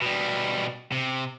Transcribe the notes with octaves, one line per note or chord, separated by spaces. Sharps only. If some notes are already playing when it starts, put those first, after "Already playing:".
B2 G3
C3